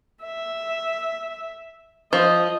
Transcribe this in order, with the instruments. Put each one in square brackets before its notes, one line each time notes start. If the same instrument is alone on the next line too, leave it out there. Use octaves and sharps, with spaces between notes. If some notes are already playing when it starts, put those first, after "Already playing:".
[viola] E5
[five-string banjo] F3 [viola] D#5